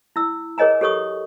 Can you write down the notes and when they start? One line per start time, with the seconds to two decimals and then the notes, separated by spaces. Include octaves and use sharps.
0.16 E4 E6
0.58 G#4 A#4 C#5 D#5 G#5 A#5
0.81 G4 A4 C#5 C#6 D#6